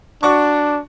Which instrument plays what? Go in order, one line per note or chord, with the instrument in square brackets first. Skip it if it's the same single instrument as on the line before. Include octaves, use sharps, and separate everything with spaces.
[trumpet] D4 [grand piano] F#4 D5 C#6